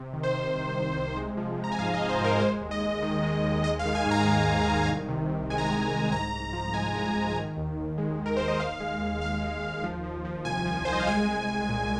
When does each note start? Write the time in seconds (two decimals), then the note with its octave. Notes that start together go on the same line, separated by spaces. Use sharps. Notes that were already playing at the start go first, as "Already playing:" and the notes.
Already playing: C3
0.13 D#3
0.23 C5
0.34 D#3
0.54 C2
0.76 C2
0.96 C3
1.16 G#3
1.37 F3
1.58 G#3
1.64 A#5
1.72 G#5
1.79 G#2 F5
1.94 D#5
1.99 G#2
2.09 C5
2.20 G#2 A#4
2.40 G#3 C5
2.61 D#2
2.71 D#5
2.81 D#2
3.02 D#3
3.23 G#3
3.43 D#2
3.64 G#3 D#5
3.79 F5
3.85 D#3
3.95 G#5
4.05 G#2
4.11 A#5
4.26 G#3
4.47 D#3
4.67 D#3
4.88 C2
5.09 C3
5.29 C3
5.50 G#3 G#5
5.58 A#5
5.66 C3 G#5
5.91 C2
6.12 G#2 A#5
6.32 G#2
6.53 F3
6.74 G#3 G#5
6.94 G#3
7.15 G#2
7.36 D#3
7.57 D#2
7.77 D#2
7.98 G#3
8.18 D#2
8.26 A#4
8.37 D#2 C5
8.48 D#5
8.60 D#2 F5
8.80 G#3
9.01 D#2
9.21 D#2 F5
9.42 G#3
9.63 D#2
9.84 F3
10.04 F3
10.25 F3
10.45 C2 G#5
10.66 F3
10.85 C2 C5
10.93 D#5
11.00 F5
11.07 G#3 G#5
11.28 G#3
11.48 C2
11.69 A#2